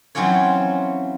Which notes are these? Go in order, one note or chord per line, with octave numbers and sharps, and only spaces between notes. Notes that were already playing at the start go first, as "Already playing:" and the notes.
E3 F#3 C4 C#4 F4 C#5